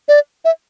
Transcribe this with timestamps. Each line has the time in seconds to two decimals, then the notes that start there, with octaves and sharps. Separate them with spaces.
0.08 D5
0.45 E5